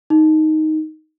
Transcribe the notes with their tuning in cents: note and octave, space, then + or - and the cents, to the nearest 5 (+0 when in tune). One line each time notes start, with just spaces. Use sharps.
D#4 +5